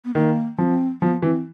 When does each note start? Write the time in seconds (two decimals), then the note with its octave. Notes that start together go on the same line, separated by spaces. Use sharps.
0.05 B3
0.15 D#3 A#3
0.58 F3 C4
1.01 F3 B3
1.22 E3 C4